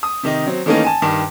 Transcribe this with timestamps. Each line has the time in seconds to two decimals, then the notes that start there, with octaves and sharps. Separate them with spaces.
0.03 D#6
0.23 C3 D#3 D#4
0.47 F#3 C4
0.66 D#3 E3 A3 A#3 C#4 D#4
0.84 G#5 A5
1.02 G2 D#3